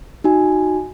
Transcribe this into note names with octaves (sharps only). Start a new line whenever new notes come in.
D#4 F#4 G#5